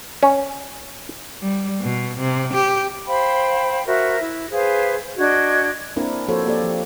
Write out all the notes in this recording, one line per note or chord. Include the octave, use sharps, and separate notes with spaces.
C#4
G3
B2
C3
G4
C5 F5 G5 B5
F#4 A#4 C5 E5
E4
G#4 B4 C5 F5
D4 F#4 D#5 G#6
A#3 C4 D4 E4 A#4
F3 A#3 F#4 A4 C5 C#5
A#3 G4 A4 D5
F3 G4